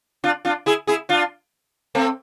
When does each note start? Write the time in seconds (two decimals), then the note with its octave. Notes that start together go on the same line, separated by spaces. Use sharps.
0.24 D4 F4
0.45 D4 F4
0.66 E4 G#4
0.87 E4 G#4
1.09 D4 F4
1.95 A3 C4